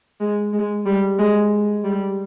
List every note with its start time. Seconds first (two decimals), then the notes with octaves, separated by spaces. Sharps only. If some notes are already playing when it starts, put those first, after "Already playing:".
0.20 G#3
0.53 G#3
0.86 G3
1.18 G#3
1.84 G3